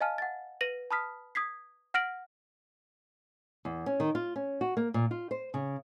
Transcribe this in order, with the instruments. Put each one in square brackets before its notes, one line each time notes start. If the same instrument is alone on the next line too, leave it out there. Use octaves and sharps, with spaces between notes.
[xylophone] D#5 F5 G#5 A5 F6
F#5 A6
B4 A#6 D#7 F#7
A5 B5 D#6 F6 B6
D#6 G#6 B6 C7
F#5 F6 A#6 D7 F#7
[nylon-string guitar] E2
C#4
D#3
F4
C#4
F#4
A#3
A#2
F4
C5
C#3